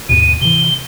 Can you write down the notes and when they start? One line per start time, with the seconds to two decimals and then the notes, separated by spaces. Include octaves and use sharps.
0.09 D#2 G#2 B2 D#7
0.41 C3 E3 G7